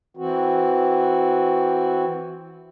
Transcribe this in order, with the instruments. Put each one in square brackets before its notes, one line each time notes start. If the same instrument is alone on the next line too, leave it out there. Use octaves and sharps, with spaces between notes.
[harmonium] E3 C4 F#4